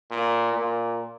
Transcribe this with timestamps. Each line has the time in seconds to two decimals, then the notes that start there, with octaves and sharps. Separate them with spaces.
0.11 A#2
0.53 A#2